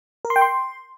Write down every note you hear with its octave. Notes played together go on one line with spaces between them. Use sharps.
A#4
C6
G5
C6